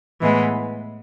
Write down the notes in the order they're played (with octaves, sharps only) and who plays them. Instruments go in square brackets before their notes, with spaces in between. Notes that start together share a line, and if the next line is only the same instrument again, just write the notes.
[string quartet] A2 E3 G#3 B3